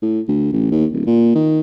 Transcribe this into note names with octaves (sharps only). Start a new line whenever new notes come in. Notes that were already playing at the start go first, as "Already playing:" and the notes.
A2
D2
A1
D#2
D1
A#2
D#3